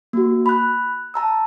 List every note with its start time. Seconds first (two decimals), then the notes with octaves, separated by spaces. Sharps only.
0.13 A#3 F#4
0.46 B5 F#6
1.14 A5 A#5 E6